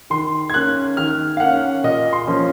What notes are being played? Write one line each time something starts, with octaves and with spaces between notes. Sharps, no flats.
D#3 C6
G#6
A#3 C#4 F#6
D#3 F6
F5
A#3 C#4 F#5
A#2 D#5
C6
F3 A#3 C#4